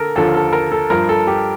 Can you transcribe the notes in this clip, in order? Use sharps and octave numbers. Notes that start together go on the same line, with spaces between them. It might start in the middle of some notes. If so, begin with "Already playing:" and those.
Already playing: D3 A4 A#4
D#2 D3 F3 A4
A4
A#4
A4
G2 F3 A#4
A4
G4